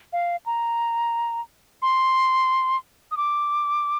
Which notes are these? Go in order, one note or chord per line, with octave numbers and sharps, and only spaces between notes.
F5
A#5
C6
D#6
D6